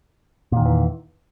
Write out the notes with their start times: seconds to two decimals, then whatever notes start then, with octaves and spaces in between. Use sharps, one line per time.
0.52 A#2
0.57 D#3
0.61 E2
0.66 E3